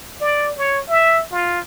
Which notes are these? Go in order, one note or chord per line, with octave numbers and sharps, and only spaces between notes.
D5
C#5
E5
F4